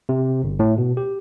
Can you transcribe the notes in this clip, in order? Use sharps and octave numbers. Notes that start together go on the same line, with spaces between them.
C3
G1
A2
B2
G4